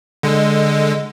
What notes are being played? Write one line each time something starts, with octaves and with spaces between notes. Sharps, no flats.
D3 G#3